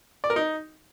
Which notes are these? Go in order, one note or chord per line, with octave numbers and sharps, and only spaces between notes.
D5
A#4
D#4